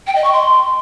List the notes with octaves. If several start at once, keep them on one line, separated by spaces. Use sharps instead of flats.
G5
D#5
C#6
C6